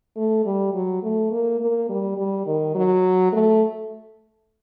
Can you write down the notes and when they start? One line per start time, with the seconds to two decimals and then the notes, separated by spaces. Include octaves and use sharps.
0.17 A3
0.46 G3
0.74 F#3
1.03 A3
1.31 A#3
1.60 A#3
1.90 G3
2.18 G3
2.46 D#3
2.75 F#3
3.32 A3